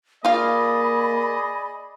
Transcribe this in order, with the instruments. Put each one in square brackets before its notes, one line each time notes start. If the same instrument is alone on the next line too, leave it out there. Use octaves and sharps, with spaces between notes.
[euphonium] A#3 [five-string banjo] F4 F5 [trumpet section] G#4 D5 D#5 [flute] B5